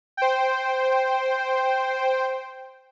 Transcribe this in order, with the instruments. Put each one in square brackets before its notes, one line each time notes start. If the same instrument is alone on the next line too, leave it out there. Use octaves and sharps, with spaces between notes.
[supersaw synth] C5 G5